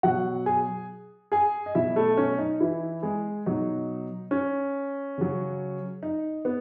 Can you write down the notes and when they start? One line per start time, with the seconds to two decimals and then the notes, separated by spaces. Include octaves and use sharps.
0.03 B2 F#3 F#4 F#5
0.46 G#4 G#5
1.32 G#4 G#5
1.66 D#5
1.75 B2 F#3 E4 E5
1.96 A3 A4
2.17 C#4
2.39 D#4
2.60 E3 E4
3.03 G#3 G#4
3.46 B2 F#3 D#4
4.31 C#4
5.18 C#3 F#3
6.03 D#4
6.45 B3